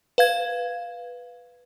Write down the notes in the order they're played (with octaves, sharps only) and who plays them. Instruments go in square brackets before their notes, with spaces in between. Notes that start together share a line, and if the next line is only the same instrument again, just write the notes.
[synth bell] B4 F5 G#6